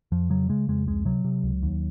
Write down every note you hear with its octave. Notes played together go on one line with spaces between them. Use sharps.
F2 F3
C#3 F#3
C#3 G#3
F2 G#3
C#2 G#3
C3 F#3
C3
C#2
D#2